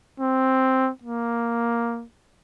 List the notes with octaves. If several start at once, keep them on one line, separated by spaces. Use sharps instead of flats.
C4
A#3